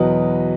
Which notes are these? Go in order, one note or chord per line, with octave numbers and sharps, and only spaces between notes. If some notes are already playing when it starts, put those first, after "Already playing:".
Already playing: E2 B2 F#3 B4 D#5